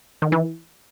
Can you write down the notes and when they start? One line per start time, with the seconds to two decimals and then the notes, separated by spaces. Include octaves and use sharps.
0.22 D#3
0.32 E3